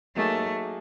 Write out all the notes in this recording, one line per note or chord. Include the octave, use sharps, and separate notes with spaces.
F#3 A3 A#3 D#4 G#4